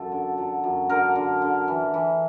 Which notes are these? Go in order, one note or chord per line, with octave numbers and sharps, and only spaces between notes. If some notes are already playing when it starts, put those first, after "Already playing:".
Already playing: F#2 A4
D3
F#3
F#2
D3 A#4
D3
D3
E3
E3